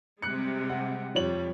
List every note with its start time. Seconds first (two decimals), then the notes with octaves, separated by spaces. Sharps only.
0.22 C3 G3 G#3 F#6 C#7
0.69 F#5
1.15 F2 F3 G3 C#5 F#7